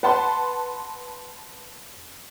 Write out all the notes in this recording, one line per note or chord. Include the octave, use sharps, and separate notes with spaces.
B4 F#5 A5 B5 C6